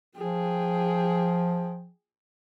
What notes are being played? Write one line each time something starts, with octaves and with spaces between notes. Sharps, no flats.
F3 G#4 G5